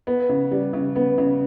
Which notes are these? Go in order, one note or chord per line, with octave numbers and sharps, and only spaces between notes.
B3
C#3
G3
C#3
B3
C#3